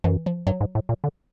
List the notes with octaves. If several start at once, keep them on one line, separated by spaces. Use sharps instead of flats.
F#2 E3
F3
G2 F#3
G#2
A2
A#2
D3